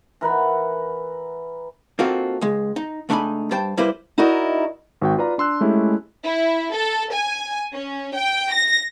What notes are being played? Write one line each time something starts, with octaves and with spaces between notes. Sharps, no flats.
E3 A#4 F#5 B5
A#3 C4 D#4 F4 F#4 A4
C#2 G#3
D#4
C#2 A3 D4 D#4 G#5 B5
G2 G3 C5 G5 A5
G3 A#3 E4 B4 C5
D#4 E4 F#4 A#4 D5 D#5
G#1 F#4 G5
F4 B4 D5 A#5
D4 C6 E6 F#6
G#3 A3 C#4 E4 G4
E4
A4
G#5
C#4
G5
A#6